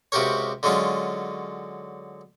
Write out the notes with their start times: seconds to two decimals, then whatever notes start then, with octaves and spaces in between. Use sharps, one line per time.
0.12 C#2 C3 F#4 G4 A#4 C#5
0.63 D3 F#3 G#3 C#4 F4